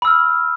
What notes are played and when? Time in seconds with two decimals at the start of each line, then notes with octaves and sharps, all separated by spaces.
0.02 B5
0.05 E6
0.08 F6